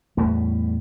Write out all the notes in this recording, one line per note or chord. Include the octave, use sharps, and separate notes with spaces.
E2 A2 G3